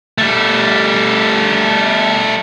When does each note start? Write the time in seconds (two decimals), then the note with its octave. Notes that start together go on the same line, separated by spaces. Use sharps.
0.18 G3 A3